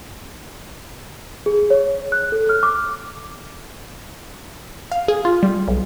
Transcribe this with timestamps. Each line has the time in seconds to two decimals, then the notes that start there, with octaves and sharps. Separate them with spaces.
1.46 G#4
1.70 C#5
2.12 F#6
2.32 A4
2.49 F6
2.63 D6
4.92 F5
5.08 G#4
5.25 F4
5.43 G3
5.68 B1